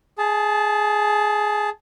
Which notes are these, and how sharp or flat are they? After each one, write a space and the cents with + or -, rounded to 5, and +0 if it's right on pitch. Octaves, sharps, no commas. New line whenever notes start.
G#4 +10 A5 -20